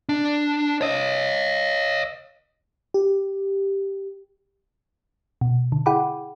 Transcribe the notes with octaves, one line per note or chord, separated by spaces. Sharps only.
D4
C#5 D#5
G4
B2
D3
E4 G#4 F#5 G5 B5 D6